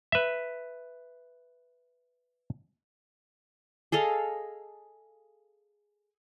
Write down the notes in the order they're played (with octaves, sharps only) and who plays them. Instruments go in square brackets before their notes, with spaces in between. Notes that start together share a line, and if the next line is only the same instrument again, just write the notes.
[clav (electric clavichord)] B4 E5
[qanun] G#4 A4 D#5 F5